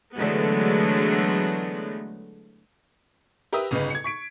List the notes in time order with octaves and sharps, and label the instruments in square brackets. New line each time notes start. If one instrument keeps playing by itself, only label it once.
[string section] D3 E3 F#3 G#3 A3 B3
[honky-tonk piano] G4 A#4 B4 E5 D#6
G1 C#3 D#4 B4
G#6 C#7
C#6 B6 D7